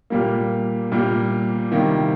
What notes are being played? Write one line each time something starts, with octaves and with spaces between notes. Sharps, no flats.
A#2 G3 A#3
A#2 G3 A#3
C3 D#3 G3 A#3